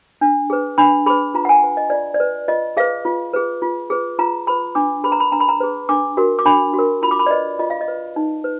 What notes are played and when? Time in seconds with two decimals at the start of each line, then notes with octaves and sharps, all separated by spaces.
0.21 D4
0.50 G#4 B4
0.78 D4 B5
1.06 G#4 B4 B5
1.34 F4 A#5
1.45 F#5
1.49 G#5
1.63 B4
1.77 D#5
1.90 F4 D5
2.14 D5
2.20 B4
2.48 F4 D#5
2.77 G#4 B4 F5
3.05 F4
3.33 G#4 B4
3.62 F4
3.90 G#4 B4
4.19 F4 A#5
4.47 G#4 B4 B5
4.75 D4 D6
5.04 G#4 B4 B5
5.12 A#5
5.20 B5
5.32 D4 A#5
5.40 B5
5.49 A#5
5.60 G#4 B4
5.89 D4 D6
6.17 F#4 A#4
6.39 D6
6.46 D4 B5
6.74 F#4
6.79 A#4
7.02 F4 B5
7.11 D6
7.19 B5
7.26 D5
7.31 B4 D#5
7.59 F4 D#5
7.70 F5
7.81 D#5
7.88 B4
8.16 D#4
8.44 B4